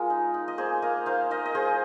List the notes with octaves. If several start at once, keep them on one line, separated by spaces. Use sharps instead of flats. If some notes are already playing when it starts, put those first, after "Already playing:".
Already playing: G#3 F4 A#4
D#4
D#4
D#5
A#3 G#4 C5
A#3 A#4 D#5
D#4 C5 F5
D#4 A#4 D#5
D#5
G#3 G#4 C5